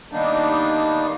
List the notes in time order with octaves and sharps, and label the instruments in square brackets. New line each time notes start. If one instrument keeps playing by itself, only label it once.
[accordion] D#3 G3 A#3 B3 D4 D#4